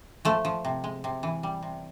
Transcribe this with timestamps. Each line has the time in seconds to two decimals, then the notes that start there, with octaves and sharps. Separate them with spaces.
0.25 F3 A3
0.45 F3
0.65 C3
0.84 G#3
1.04 C3
1.23 E3
1.43 G3
1.63 C3